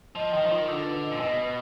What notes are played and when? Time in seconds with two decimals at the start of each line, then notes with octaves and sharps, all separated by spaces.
0.15 F3 D#5
0.33 D#3 D#5
0.46 F3
0.51 D#3 F4
0.68 D3 F4
0.85 B4
1.03 D#5
1.11 A#2
1.20 B2 D#5
1.38 B4